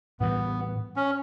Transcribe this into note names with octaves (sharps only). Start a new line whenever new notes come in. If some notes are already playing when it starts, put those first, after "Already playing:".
A2 E3 G3 B3
C#4